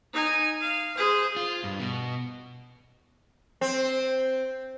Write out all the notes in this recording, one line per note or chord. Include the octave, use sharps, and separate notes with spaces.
D#4 G#5
F5
G#4 C5
F4
G2
B2
C4